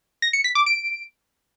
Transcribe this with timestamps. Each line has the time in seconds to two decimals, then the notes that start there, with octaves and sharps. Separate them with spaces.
0.22 A#6
0.33 C#7
0.44 B6
0.55 D6
0.66 D7